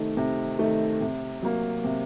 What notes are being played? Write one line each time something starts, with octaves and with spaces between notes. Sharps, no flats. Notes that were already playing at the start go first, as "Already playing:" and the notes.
Already playing: C3 D#3 A3
C3
D#3 A3
C3
F#3 A#3
C3